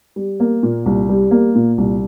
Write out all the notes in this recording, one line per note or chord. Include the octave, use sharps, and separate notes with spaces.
G3
A#3
A#2
C2
G3
A#3
A#2
C2